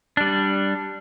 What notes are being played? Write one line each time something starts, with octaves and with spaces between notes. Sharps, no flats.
G3 D4